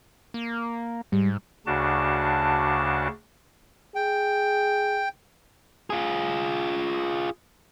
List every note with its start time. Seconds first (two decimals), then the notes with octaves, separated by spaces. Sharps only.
0.34 A#3
1.12 G#2 G3
1.66 D2 C#3 D4 F#4 A5
3.95 G#4 G5
5.90 F4 G#4